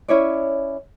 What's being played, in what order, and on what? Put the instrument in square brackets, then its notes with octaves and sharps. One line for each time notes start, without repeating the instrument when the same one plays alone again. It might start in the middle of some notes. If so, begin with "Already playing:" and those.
[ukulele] C#4 E4 C#5 D5